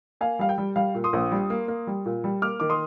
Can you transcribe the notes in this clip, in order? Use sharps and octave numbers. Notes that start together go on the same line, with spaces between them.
A#3 F5 G#5
G3 F5
G5
G3
G3 F5
A#2
C6 D#6
A#1
G3
A#3
A#3
G3
A#2
G3
A#3 D6 F6
D#3 D6
C6 D#6